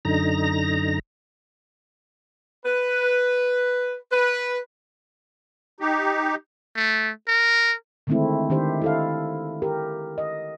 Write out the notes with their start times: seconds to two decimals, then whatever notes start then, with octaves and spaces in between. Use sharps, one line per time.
0.05 F#2 D3 D#4 A#5 A#6
2.66 B4
4.11 B4
5.80 D#4 G4
6.76 A3
7.28 A#4
8.07 D3 D#3 G#3 A3 C4 E4
8.50 D#3 D4 G4 C5 E5
8.82 E4 A4 F5
9.62 G4 A#4
10.18 D#5